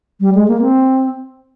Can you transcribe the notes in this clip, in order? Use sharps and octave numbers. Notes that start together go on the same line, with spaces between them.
G3
G#3
A#3
C4